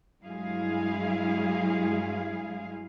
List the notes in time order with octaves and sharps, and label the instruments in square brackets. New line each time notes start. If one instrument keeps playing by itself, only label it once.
[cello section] G2 F#3 G#3 E4 G#4 F5